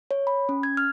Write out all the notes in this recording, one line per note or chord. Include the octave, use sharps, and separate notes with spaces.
C#5
B5
C#4
G#6
F6